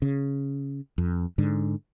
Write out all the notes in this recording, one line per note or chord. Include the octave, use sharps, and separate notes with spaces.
C#3
F2
G#2 D3